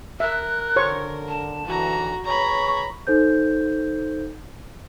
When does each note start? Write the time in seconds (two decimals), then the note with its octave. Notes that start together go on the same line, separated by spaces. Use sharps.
0.20 A#4 E5 F#6
0.76 D3 C5 C#5 C#6
1.28 A5
1.65 D#2 D3 E3 F#4 A#5
2.25 G#4 B4 C#5 A#5 B5 C#6
3.07 D#4 A4 C5 G6